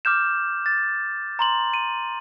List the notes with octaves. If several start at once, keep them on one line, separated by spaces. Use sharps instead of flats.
D6 F6 G6 E7
A6
A#5 C6 F#7
D#7